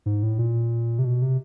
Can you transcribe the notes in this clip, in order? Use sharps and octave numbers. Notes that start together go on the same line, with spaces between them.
G#2
A2
A#2
C3
B2
C3